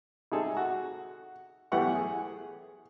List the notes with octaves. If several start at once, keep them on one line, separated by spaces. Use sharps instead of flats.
C3 D#4 G#4 A4
F#4
B1 E3 A3 G4 F#5 C#6
G#4